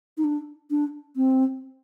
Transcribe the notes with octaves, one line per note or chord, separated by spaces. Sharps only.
D#4
D4
D4
C4